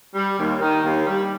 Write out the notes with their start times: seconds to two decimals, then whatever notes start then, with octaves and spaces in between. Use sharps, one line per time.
0.15 G3
0.38 D#2
0.61 D#3
0.84 D#2
1.07 G3